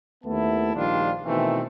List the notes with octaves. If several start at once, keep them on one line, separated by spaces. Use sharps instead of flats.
D#2 A3 B3 E4 A5
A#1 D#3 G3 D4 F4
B2 D#3 E3 A3 C4